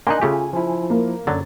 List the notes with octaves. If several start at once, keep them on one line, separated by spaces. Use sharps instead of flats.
A#3 D4 D#4 G#5 C6 F#6
C#3 A3 F4 G4
F3 E4
A#3
F#2 D3 F#3 A6